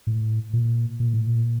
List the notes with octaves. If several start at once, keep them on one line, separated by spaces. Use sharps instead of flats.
A2
A#2
A#2
A2
A#2